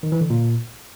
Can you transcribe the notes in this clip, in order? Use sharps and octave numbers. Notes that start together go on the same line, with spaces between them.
D#3
E3
D3
A#2